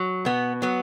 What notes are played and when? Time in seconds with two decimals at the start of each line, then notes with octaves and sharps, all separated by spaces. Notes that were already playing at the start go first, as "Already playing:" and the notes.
Already playing: F#3
0.25 B2 B3
0.62 F#3 B3